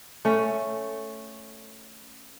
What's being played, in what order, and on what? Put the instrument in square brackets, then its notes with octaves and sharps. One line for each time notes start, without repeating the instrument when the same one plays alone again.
[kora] A3 C#4